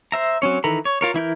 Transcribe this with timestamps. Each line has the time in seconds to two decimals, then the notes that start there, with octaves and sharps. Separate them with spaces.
0.12 C5 E5 A#5
0.42 F#3 C4 C#4 C#5
0.64 D#3 E3 A4 A#5 B5
0.85 C#5
1.01 F4 A#4 C#5
1.14 E3 E4 A#4 G6